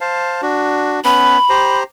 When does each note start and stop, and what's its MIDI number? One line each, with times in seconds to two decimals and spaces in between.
0.01 0.41 72
0.01 0.41 77
0.01 0.41 81
0.42 1.00 62
0.42 1.00 66
1.05 1.38 59
1.05 1.38 61
1.05 1.38 71
1.05 1.79 83
1.49 1.83 67
1.49 1.83 72
1.49 1.83 82